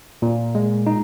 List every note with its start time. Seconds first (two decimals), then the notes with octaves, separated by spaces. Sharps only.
0.22 A#2
0.55 G#3
0.87 D#4